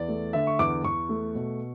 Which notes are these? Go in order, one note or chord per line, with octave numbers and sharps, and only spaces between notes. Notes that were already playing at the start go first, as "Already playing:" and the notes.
Already playing: E2 D5
A3
D3 E5
C#6
E2 D6
E2 C#6
A3
B2